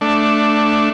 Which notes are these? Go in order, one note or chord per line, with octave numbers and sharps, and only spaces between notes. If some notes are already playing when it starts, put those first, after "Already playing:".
A3 D4